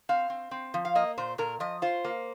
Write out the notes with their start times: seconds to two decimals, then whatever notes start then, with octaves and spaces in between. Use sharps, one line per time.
0.09 C4 F5
0.30 C4
0.51 C4
0.74 F3
0.85 F5
0.95 A#3 D#5
1.18 A#2 C5
1.38 A#2 A#4
1.60 F3 D#5
1.82 F4 C5
2.05 A#3